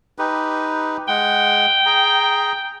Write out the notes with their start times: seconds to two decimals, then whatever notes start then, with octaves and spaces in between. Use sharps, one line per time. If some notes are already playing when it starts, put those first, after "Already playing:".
0.19 D#4 G4 B4
1.08 G#3 F#5 G5
1.86 G#4 A#5